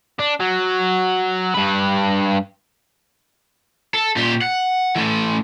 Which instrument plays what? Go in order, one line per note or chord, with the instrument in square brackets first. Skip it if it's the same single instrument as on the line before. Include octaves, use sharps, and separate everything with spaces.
[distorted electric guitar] D4
F#3
G2 B4
[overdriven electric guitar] A4
A#2 G4
F#5
E3 A3